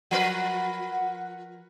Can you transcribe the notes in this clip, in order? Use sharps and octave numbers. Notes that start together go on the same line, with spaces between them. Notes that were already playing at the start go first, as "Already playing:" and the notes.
F3 A#4 B4 F#5